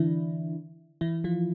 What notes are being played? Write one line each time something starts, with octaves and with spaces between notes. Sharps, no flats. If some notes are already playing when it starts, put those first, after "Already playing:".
Already playing: D3 E3 D4 E4
E3 E4
F3 F4